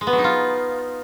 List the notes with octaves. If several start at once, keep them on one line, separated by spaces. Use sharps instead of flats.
G#3
B3
F#3
D#4
F4